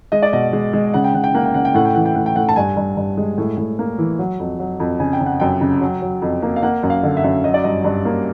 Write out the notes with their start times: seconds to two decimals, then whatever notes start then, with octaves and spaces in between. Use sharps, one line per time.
0.12 G#3 D#5
0.22 D5
0.33 B2 D#5
0.53 G#3
0.73 G#3
0.94 C#3 F#5
1.04 G5
1.14 C#3 F#5
1.24 G5
1.34 A#3 F#5
1.45 G5
1.54 C#3 F#5
1.65 G5
1.74 A2 F#5
1.85 G5
1.95 E3 F#5
2.06 G5
2.15 A2 F#5
2.26 G5
2.36 A2 F#5
2.49 A5
2.56 G2 G#5
2.77 G2
2.97 G2
3.17 G#3
3.38 A2
3.57 A2
3.79 A#3
3.99 E3
4.19 F#3
4.39 F2
4.59 F#3
4.80 F2
5.00 C#3 G#5
5.13 G5
5.20 C#3
5.26 F#5
5.40 F#2 G5
5.61 C#3
5.81 F#3
6.02 F#3
6.22 F2
6.42 A#3
6.56 F5
6.63 A#3 F#5
6.83 F#2
6.90 F5
7.03 D3
7.17 E5
7.24 F#2
7.44 F#3 D#5
7.54 D5
7.64 G2 D#5
7.84 G2
8.05 A#3